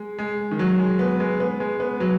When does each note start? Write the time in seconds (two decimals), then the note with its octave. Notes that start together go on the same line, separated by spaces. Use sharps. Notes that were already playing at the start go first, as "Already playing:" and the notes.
Already playing: G#3
0.19 G#3
0.51 D#3
0.59 F#3
0.79 G#3
0.99 B3
1.20 G#3
1.40 B3
1.60 G#3
1.80 B3
2.00 F#3